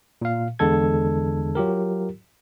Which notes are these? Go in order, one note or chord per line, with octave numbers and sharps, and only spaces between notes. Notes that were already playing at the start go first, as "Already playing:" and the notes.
A#2 F5
E2 D3 G#3 A4 G#6
F#3 F4 G4 A#4